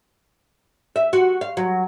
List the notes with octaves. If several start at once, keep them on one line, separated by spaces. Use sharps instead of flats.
E5
F#4
F5
F#3